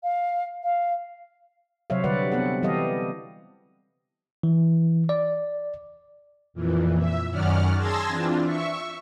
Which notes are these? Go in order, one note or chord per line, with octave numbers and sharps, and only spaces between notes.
F5
F5
C3 F#3 C5 C#5 E5 F5
D3 G3 F#4 B4 D5 F#5
B3 C4 A4 F#5
E3 G3 G4 A4 D#5 F5
E3
D5
F2 A#2 E3
E5
F#2 D#3 C#4 D5 F#5 F6
G#4 A5 C6 E6 G#6 A#6
E3 C4 D4 F4
E5 C#6